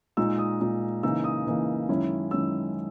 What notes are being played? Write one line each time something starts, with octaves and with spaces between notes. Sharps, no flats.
A#2 G#3 D#4 E6
D#6
A#2 G#3 D#4
C#3 E3 A#3 D#4 E6
D#6
C#3 E3 A#3 D#4
F#2 D#3 G#3 C#4 E4
F#2 D#3 G#3 C#4 E4 E6